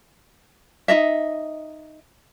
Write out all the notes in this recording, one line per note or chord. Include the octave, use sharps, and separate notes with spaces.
D#4 F4 D#5 E5